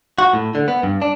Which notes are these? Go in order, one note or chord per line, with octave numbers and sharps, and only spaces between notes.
F#4
A2
D3
B3
G2
D4